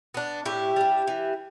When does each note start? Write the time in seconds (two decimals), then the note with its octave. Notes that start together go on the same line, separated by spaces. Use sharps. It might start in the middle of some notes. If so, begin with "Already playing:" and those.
0.14 B3 D4
0.45 A2 E4 G4
0.76 G3 D4
1.08 E3